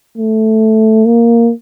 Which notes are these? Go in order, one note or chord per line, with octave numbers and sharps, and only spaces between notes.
A3
A#3